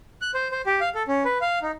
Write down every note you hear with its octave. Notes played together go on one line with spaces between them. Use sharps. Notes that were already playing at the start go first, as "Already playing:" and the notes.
F#6
C5
C5
G4
F5
A4
C#4
B4
F5
D#4